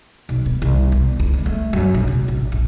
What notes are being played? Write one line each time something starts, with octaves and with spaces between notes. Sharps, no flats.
B1
B3
C2
B3
C#2
B3
A3
F#2
A#1
C3
A1
A#1